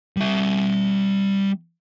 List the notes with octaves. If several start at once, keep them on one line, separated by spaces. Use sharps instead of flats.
G3 E5